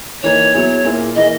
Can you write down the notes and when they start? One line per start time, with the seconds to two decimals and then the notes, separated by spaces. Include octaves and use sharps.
0.23 E3 A#3 D#4 C#5
0.54 F#3 B3 E4 G#4
0.85 A#2 A#3 E4 G#4
1.16 E3 A#3 E4 G#4 D#5